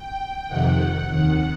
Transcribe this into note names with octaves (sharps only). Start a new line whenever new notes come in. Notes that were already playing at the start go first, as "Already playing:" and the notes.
Already playing: G5
F2 C3 D#3 F#5
D#2 D#3